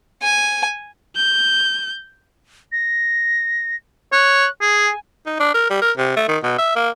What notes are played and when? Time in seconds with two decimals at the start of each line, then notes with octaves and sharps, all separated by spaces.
0.22 G#5
1.16 G6
2.72 A#6
4.13 C#5 F#6
4.61 G#4 G#5
5.26 D#4
5.40 D4
5.54 A#4
5.70 G3
5.82 A#4
5.97 C3
6.16 A3
6.28 D#3
6.43 B2
6.58 E5
6.76 A#3